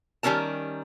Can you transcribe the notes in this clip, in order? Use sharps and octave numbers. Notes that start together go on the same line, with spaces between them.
D#3 G3 C#4 A#4 A5